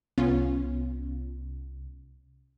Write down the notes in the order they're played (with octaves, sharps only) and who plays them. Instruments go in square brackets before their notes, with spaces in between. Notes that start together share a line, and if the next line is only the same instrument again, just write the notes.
[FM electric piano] C2 [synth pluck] B3 C#4 F4